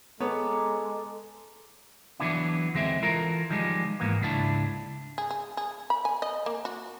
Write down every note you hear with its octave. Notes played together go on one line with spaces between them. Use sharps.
G#3 B3 A4 C#5 A#5 D6
E3 F#3 B3 D4 E4
D2 E3 G#3 C4 E5
E3 F4 A4 A#4
D#3 F3 G3 G#3
G#2 E3 A#3 B3
C#2 G#2 D4 E4 A5
G#4
G#4
G#4
B5
G#5
D#5
A#3
F#4